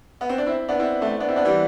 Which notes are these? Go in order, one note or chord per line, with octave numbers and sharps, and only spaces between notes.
B3
C4
D4
C4 E4
B3 D4
C4 E4
A3 C4
B3 D4
C4 E4
B3 D4
E3 G3